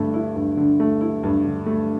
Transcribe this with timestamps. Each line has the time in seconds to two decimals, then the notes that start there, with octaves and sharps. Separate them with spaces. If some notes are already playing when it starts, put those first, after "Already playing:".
Already playing: G2 D3 A3
0.14 E4
0.36 G2
0.57 D3
0.80 A3
1.01 E4
1.23 G2
1.44 D3
1.66 A3